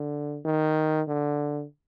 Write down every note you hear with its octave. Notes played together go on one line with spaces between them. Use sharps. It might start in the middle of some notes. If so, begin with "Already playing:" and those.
Already playing: D3
D#3
D3